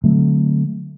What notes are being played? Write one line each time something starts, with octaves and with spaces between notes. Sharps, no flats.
D3 F#3 A3 C4